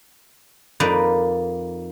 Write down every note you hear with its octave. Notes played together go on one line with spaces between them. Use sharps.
F2 A#3 D#4 B4 D5 A#5